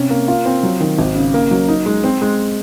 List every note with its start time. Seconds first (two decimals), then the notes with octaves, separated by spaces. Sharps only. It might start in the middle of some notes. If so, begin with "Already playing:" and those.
Already playing: C3 C#4
0.10 A#3
0.28 F4
0.45 C4
0.63 F#3
0.80 D#3
0.98 G#1
1.16 C#3
1.34 A#3
1.51 F#3
1.68 D#4
1.86 G#3
2.04 C4
2.22 G#3